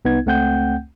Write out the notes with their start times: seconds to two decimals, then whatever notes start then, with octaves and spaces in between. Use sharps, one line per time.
0.05 C2 B3 D#4 G#6
0.26 C#2 A3 C4 F#5 G5 G6